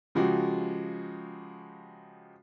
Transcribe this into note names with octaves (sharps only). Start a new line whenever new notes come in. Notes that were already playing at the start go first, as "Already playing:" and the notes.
C#3 F3 G#3 F#4 G4